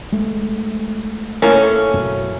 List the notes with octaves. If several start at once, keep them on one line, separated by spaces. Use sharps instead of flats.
G#3 A3
A2 A#3 C#4 A4
F#2 B2